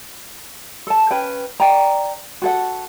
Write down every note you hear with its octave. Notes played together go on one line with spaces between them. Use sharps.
A4 A5
C#4 B4 F5 G5
D5 G5 A#5
F#4 A4 F#5